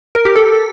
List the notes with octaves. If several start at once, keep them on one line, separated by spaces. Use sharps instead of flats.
A#4
G4
A4